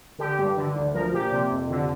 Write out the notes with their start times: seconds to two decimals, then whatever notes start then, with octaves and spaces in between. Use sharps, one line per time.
0.18 D3 G4
0.39 G2
0.57 D3
0.75 D2
0.94 F3 A#4
1.13 A#2 G4
1.32 C3
1.51 F2
1.70 D3